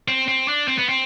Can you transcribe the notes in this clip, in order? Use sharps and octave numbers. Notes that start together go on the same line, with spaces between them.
C4
C4
D4
C4
B3
C4